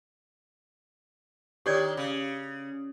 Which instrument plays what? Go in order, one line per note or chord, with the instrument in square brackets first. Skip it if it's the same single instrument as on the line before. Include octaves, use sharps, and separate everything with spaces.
[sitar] D#3 D4 [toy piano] G4 C#5 D5
[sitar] C#3